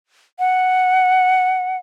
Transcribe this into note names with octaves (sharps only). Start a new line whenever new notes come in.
F#5